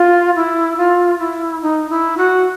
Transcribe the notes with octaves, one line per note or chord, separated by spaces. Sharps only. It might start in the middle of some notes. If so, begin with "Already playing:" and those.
Already playing: F4
E4
F4
E4
D#4
E4
F#4